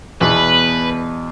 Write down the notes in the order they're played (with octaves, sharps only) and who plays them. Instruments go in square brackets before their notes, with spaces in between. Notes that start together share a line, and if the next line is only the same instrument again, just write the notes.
[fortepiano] E2 B2 [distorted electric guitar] B4